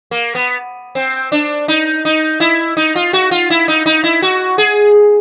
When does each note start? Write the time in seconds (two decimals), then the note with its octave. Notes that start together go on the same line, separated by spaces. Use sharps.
0.11 A#3
0.35 B3
0.95 C4
1.32 D4
1.68 D#4
2.05 D#4
2.40 E4
2.77 D#4
2.96 F4
3.13 F#4
3.31 F4
3.50 E4
3.68 D#4
3.86 D#4
4.04 E4
4.22 F#4
4.58 G#4